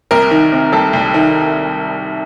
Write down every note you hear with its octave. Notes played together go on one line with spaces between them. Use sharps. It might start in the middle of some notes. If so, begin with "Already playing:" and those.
C2 A#4
D#3
C3
C2 A4
C2
D#3